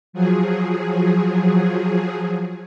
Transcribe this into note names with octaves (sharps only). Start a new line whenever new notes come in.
F3 F#3 G#4